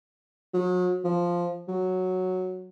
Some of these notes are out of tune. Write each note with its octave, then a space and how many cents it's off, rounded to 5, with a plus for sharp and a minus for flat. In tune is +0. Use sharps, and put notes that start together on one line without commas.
F#3 -35
F3 +0
F#3 -5